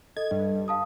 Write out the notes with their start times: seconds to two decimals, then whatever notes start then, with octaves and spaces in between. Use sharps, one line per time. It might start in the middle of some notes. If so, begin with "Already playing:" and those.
0.17 A4 D#5 G#6
0.31 G2
0.68 F5 A5 D#6